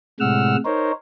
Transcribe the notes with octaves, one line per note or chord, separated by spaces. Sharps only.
A2 C3 G#3 F#5 E6 F6
D#4 A#4 C5 C#5